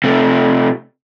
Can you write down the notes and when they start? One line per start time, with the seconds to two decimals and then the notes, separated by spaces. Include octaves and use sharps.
0.04 C3 A3